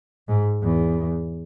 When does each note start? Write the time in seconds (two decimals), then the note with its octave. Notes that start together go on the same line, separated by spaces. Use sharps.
0.28 G#2
0.63 E2